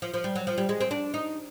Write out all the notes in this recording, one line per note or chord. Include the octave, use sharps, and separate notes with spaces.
F3
F3
G3
F#3
F3
G3
G#3
C4
D4
D#4